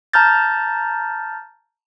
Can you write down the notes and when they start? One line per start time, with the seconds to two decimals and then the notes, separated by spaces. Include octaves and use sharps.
0.13 A5 A#5 F6 G6 A6